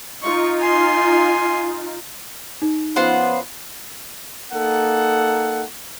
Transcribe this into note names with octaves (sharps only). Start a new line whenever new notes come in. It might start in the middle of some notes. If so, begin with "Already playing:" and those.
D#4 F4 C#6
G#5 C6
D#4
F3 B3 C#4 F4 C5 F#5
A#3 D#4 A4 F#5